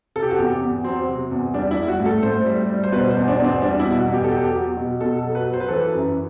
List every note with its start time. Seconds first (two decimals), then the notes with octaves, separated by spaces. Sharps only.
0.16 C3 A4
0.22 G4
0.31 F#4
0.39 E2 G4
0.61 E2
0.84 F#3 C4
1.07 C3
1.31 E2
1.54 G3 D4
1.71 E4
1.77 G3
1.88 F#4
2.00 A2
2.06 A4
2.23 A2 C5
2.46 G3
2.70 G3
2.84 C5
2.92 B2 B4
3.11 C5
3.16 E2
3.28 D4
3.38 E2
3.44 C4
3.62 G3 D4
3.79 E4
3.85 B2
3.97 F#4
4.08 E2
4.14 G4
4.24 A4
4.31 F#3 G4
4.55 F#3
4.77 B2
5.01 B2 A4
5.18 A4
5.24 F#3
5.35 B4
5.47 F#3
5.53 C5
5.60 B4
5.68 E3 A4
5.76 B4
5.94 F#2